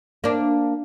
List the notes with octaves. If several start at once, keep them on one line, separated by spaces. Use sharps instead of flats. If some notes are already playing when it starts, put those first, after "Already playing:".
A#3 D4